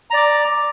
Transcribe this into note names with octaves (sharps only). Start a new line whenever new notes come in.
D5 A#5 D6